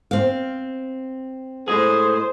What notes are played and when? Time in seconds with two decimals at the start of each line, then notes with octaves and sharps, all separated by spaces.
0.11 C4 F5
1.68 A2 G#3 G#4 C5